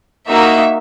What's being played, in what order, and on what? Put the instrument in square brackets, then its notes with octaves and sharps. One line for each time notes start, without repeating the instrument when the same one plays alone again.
[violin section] A#3 D#4 F#4 E5